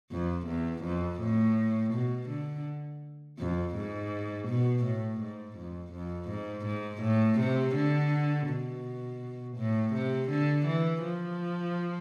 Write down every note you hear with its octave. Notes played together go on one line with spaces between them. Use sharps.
F2
E2
F2
A2
B2
D3
F2
G#2
B2
A2
G#2
F2
F2
G#2
G#2
A2
C3
D3
B2
A2
C3
D3
E3
F3